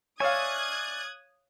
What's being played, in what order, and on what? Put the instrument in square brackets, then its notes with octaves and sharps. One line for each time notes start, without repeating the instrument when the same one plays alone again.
[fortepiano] C#5 F5 [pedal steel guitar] D5 E5 G#5 [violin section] D#6 F#6 G#6